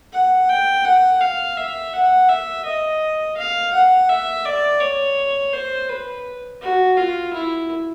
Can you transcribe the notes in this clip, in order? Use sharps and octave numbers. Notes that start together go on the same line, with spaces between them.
F#5
G5
F#5
F5
E5
F#5
E5
D#5
F5
F#5
E5
D5
C#5
C5
B4
F#4
F4
E4